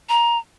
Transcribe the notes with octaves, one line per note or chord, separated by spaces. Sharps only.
A#5